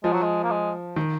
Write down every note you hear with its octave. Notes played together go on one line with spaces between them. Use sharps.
F3 G#3
F#3
G#3
A#3
G#3
D#3